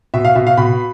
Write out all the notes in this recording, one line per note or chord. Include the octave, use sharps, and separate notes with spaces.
B2 E5
F5
B2 E5
F5
B2 B5